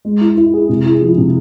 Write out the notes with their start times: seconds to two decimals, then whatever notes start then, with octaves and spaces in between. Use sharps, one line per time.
0.05 G#3
0.21 E4
0.37 E4
0.54 G#4
0.69 C3
0.85 E4
1.01 F3
1.17 C3